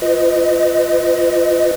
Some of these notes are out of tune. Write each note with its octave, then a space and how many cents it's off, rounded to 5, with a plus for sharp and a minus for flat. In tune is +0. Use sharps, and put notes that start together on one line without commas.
F4 -10 B4 +35 D#5 +0